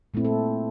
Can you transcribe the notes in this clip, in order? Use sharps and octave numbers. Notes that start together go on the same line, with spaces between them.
A#2 A3 C4 E4
A4